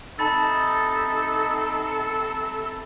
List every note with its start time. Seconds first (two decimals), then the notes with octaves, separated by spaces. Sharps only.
0.19 C3 D#4 A4 A5 B5 A6